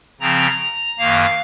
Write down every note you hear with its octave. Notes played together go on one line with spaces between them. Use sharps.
C#3 F3 C4 A#5
F#2 D#3 A#3 F5